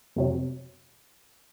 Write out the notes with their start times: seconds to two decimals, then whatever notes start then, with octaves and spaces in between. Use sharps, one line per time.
0.16 F2 C3 F#3